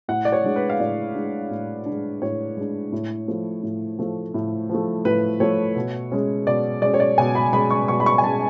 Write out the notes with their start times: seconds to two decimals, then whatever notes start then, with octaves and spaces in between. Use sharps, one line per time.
0.08 A2 F#5
0.25 D5
0.32 C#5
0.44 G#3 D4
0.56 B4
0.70 F5
0.80 A2 D5
1.15 G#3 D4
1.51 A2
1.86 G#3 D4
2.22 A2 C#5
2.57 G#3 D4
2.92 A2
3.28 F3 A3
3.63 A2
3.99 F3 A3
4.34 A2
4.69 F3
4.74 A3
5.05 A2 B4
5.40 F3 A3 C#5
5.76 B2
6.12 G#3 C#4
6.47 B2 D5
6.82 G#3 C#4 D5
6.94 C#5
7.00 D5
7.18 B2 G#5
7.35 B5
7.53 G#3 C#4 B5
7.71 C#6
7.88 B2 C#6
8.00 B5
8.06 C#6
8.18 G#5
8.23 G#3 C#4 A5